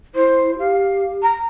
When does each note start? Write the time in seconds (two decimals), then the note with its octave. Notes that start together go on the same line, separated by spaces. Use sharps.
0.15 E4 C5
0.59 G4 F5
1.22 A#5